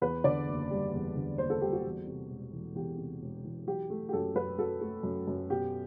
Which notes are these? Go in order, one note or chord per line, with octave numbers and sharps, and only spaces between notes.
E2 B4
D3 D5
F#1
G3
E2
D3
F#1 C5
A4
G3 G4
F#4
E2
C3
E1
E3
E2 G4
C3
E1
E3
F#3 G4
A3
G4
F#2 A4
F#2 B4
F#3 A4
A3
F#2
F#2
B2 G4